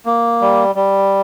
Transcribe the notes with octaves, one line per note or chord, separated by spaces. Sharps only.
A#3
G3
G3